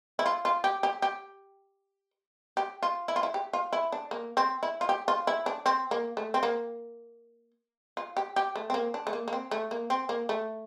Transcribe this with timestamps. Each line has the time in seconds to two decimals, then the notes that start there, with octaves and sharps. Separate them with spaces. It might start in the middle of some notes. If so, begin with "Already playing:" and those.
0.19 E4
0.26 F4
0.45 F4
0.64 G4
0.83 G4
1.02 G4
2.57 G4
2.83 F4
3.08 E4
3.16 F4
3.23 E4
3.34 G4
3.53 F4
3.73 E4
3.92 D4
4.11 A#3
4.37 C4
4.63 E4
4.81 F4
4.89 G4
5.08 F4
5.27 E4
5.46 D4
5.66 C4
5.91 A#3
6.17 A3
6.34 C4
6.43 A#3
7.97 F4
8.17 G4
8.36 G4
8.56 A3
8.70 C4
8.74 A#3
8.94 D4
9.07 A3
9.13 A#3
9.28 A#3
9.33 C4
9.51 A3
9.71 A#3
9.90 C4
10.09 A#3
10.29 A3